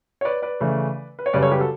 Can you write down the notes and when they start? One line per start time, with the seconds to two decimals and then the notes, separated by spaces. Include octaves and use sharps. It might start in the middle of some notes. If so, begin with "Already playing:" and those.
0.21 C#5
0.25 B4 D5
0.42 B4 D5
0.60 C#3 E3 A3
1.19 B4
1.26 C#5
1.33 F#2 C#3 G3 B4 D5
1.42 A4 C#5
1.51 G4 B4
1.60 F#4 A4